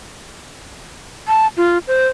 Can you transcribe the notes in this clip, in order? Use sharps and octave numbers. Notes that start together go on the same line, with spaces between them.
A5
F4
C5